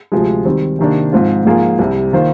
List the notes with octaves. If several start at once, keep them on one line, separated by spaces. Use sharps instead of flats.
D2 C3 F3 G#3
D#3 G3 C4
C3 D#3 A#3 D4
G#2 F3 C4 F4
G#2 F3 A#3 F4 G#4
C2 C3 G3
D#3 A#3 F4 C5